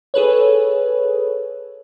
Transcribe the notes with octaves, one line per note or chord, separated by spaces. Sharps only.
G#4 A4 B4 C#5